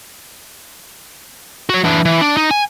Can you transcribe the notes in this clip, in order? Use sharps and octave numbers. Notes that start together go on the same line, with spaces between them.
F#4 C#5
E3 D4
E3
D4
D#4
G#5